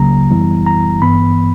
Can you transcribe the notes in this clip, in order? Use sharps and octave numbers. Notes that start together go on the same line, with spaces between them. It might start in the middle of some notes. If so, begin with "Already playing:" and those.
Already playing: C#2 C#3 F#3 A#3 A#5
F#2 E3 G3 B3 E4
A#5
G2 E3 B3 B5